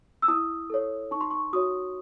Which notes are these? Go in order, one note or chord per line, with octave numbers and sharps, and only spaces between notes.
E6
E4 D#6
A4 C#5
D#4 C#6
C6
C#6
F#4 C#5 D#6